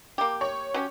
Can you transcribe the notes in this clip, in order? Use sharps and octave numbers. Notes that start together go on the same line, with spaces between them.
A#3 G4
C#5
F#3 C#4 G4